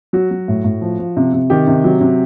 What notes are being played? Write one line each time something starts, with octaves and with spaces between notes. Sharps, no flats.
F#3 F#4
F#3
A2
A2
F3
F3
C3
C3
D#3 G4
C3
F#3
C3